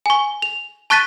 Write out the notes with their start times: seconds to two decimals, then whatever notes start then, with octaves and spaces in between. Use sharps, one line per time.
0.06 G#5 C#6
0.42 F7
0.90 A5 C#6 F#6 A6 B6 D#7